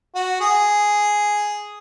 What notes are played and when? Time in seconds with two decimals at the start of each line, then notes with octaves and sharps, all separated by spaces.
0.15 F#4
0.41 G#4